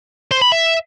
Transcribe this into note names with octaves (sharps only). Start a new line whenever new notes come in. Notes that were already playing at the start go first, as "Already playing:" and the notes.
C5
B5
E5